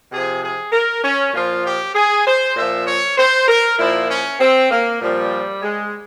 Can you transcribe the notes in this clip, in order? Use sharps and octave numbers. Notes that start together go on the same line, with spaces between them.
C3 F3 G#4
G#4
A#4
C#4
A#2 F3 F4
G4
G#4
C5
A#2 F3 E5
C#5
C5
A#4
A#2 F3 E4
C#4
C4
A#3
A#2 F3 G3
G#3